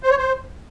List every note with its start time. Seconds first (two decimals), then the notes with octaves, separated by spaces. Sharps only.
0.03 C5
0.11 C#5
0.18 C5